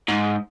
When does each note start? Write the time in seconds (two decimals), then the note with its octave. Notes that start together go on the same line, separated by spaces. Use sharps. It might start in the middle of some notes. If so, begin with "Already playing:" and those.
0.09 G#2